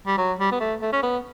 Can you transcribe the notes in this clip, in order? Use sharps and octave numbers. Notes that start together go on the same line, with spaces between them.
G3
F#3
G3
B3
A3
A3
C#4
B3